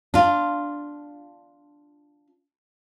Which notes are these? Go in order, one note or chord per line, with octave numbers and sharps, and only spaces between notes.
D4 F4